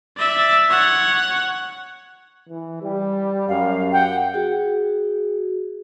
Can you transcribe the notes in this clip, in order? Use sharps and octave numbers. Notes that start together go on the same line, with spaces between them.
D5 E5
C#5 F#5
E3
G3 G4
F#2 F5
F#5 G5
F#4 G#4